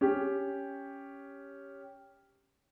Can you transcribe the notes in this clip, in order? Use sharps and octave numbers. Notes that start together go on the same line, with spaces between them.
C#4 G4